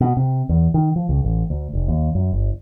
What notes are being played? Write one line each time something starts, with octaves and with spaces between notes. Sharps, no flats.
B2
C3
E2
D#3
F3
C#2
A1
D2
F1
D#2
F#2
G1